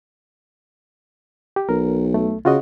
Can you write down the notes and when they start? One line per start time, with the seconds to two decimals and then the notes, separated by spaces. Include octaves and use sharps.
1.56 G4
1.69 B1 A#4
2.14 A3
2.45 C#3 F4 F#4 D#5